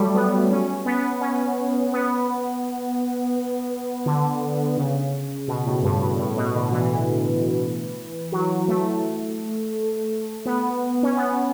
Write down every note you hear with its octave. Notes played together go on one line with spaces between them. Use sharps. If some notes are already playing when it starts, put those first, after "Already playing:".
Already playing: F#3 G3 A3
B3
C#4
B3
C#4
B3
D3
C#3
B2
A2
G2
G2
A2
B2
D3
E3
F#3
A3
B3
C#4
B3